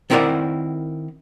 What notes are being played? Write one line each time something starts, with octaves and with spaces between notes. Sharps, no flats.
D#3 C4 E4 A#4 D5 F#5